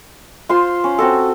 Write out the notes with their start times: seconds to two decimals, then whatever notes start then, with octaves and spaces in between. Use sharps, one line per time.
0.49 F4 C5 C6
0.84 C#4
0.99 C4 F#4 A4